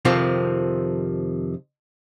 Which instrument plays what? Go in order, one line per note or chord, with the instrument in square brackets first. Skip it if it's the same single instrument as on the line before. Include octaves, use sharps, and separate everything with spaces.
[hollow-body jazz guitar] F2 C3 D#3 F3 C4